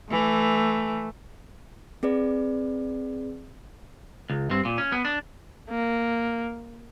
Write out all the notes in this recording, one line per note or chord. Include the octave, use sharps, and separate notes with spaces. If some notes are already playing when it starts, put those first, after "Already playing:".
E3 A3
C4 G#4 B4 D5
C#2
G2 C4
A#2
C#4
B3
D4
A#3